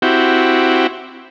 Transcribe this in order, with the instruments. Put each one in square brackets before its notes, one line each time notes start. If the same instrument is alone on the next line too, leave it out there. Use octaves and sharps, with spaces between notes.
[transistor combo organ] C4 E4 F#4 G4